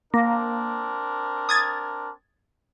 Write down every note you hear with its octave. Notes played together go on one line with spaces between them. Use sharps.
A#3 C4 D4 A#4
D#6 G#6 A6